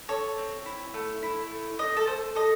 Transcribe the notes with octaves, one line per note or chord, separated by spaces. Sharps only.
A4 C#5
C4
E4
A3
E4
A3
A3 D#5
A4
A3 C5
A4 D#5